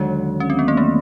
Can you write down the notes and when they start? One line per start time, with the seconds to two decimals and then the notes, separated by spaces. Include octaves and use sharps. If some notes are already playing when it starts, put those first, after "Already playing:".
Already playing: D#2 D3 F#3 G#3
0.40 C#4
0.50 C4
0.59 B3
0.68 A#3
0.77 A3